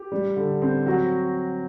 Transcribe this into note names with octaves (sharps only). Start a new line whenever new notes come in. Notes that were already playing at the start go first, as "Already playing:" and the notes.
Already playing: G4
G3
D3
C4
F#3 F#4